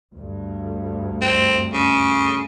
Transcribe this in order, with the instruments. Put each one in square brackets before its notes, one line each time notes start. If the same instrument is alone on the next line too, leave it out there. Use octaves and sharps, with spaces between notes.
[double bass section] D2 G2
[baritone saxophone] C4
C#3